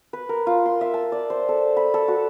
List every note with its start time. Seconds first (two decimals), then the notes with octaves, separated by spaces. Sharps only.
0.13 B4
0.29 A#4
0.47 F4
0.66 C6
0.81 E5
0.94 A5
1.12 D5
1.30 C5
1.49 A4
1.77 B5
1.94 A4
2.08 F#4